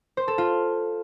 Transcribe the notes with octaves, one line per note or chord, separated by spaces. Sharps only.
C5
A4
F4